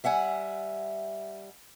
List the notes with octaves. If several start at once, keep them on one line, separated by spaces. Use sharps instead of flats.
G3 E5 F#5 G#5